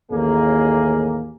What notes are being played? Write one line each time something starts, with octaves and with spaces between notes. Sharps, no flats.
A1 D#2 A#3 G#4